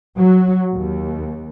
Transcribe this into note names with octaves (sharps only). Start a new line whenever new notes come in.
F#3
D#2